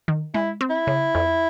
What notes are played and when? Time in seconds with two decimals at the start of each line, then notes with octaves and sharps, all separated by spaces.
0.08 D#3
0.34 G#3 E4
0.61 C4
0.70 E4
0.87 C#3
1.15 F2